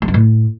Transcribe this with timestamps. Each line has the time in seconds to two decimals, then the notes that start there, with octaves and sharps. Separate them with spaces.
0.02 G#3
0.08 G2
0.14 A2